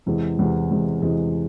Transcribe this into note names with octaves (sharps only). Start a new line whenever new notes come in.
E2 C3 E3 G#3
E2 C3 E3 G#3
E2 C3 E3 G#3
E2 C3 E3 G#3